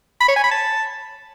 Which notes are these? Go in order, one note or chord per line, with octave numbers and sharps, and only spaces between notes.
B5
C#5
G#5
B5
A5